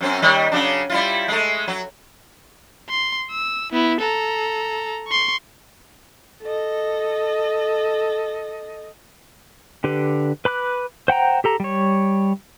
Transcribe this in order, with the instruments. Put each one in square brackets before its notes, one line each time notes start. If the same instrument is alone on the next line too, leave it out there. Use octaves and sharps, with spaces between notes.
[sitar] F#2 C4 C#4
D#3 G3
C#3 F#3 D4
G3 E4 F4
G#3 A3
F#3
[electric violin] C6
E6
B3 E4
A4 A#5
C6 C#6
[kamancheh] A4 D#5
[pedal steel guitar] D3 G4 B4
B4 B5 D6 F#6
C5 F#5 G5 A#5
G4 A4 A#5
G3 C#5